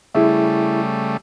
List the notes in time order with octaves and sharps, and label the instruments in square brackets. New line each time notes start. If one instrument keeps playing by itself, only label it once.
[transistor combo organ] C#3 G3 A3 [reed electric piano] E4 G#4 E5